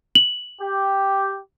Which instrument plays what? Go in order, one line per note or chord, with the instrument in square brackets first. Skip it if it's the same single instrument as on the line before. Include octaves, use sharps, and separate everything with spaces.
[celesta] F#7
[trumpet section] G4